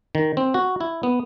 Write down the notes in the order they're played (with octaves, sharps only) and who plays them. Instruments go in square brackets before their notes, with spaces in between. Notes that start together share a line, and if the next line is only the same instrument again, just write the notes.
[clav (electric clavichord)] D#3
C4
F#4
E4
B3